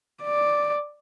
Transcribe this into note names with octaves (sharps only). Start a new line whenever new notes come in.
D5